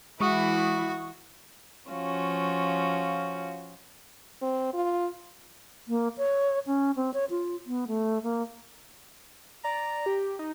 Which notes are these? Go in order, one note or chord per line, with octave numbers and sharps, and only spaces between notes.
E3 G#3 E4 F#4 C#6 D#6
F3 C#4 F4 F#4
C4
F4
A#3
C#5
C#4
C4
C#5
F4
B3
A3
A#3
D5 A#5
G4
D#4